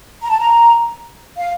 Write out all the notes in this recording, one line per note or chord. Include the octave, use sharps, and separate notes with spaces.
A#5
A5
A#5
F5